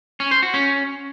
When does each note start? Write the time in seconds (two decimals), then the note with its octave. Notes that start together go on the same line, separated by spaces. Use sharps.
0.20 C#4
0.31 C5
0.43 F#4
0.54 C#4